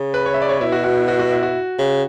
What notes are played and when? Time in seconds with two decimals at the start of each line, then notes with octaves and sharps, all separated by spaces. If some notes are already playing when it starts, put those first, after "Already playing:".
Already playing: C#3
0.14 B4
0.26 C#5
0.34 E5
0.42 D5
0.49 C#5
0.60 B2 E4
0.72 F#4
0.84 F#4
0.96 E4
1.08 F#4
1.19 F#4
1.31 E4
1.43 F#4
1.78 C#3